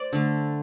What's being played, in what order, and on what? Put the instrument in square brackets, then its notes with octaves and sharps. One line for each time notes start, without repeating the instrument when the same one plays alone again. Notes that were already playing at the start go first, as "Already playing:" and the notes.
Already playing: [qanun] C5 D5
D3 A3